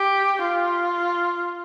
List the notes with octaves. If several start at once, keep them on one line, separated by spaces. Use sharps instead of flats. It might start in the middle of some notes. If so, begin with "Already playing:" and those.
Already playing: G4
F4